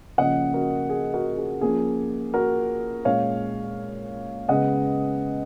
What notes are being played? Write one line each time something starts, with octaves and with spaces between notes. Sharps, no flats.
C#3 F3 A#3 C#4 D#5 F#5
F#4 A#4
G#4
F#4 A#4
G#4
F3 A#3 C#4 G#4
F#4 A#4
A#2 G#3 C#4 C#5 F5
C#3 G#3 B3 D#5 F#5